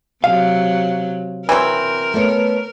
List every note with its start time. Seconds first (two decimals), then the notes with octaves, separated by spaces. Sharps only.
0.24 C3 F#3 F5
1.49 E3 F#3 C4 A#4
2.14 A3 B3 C#5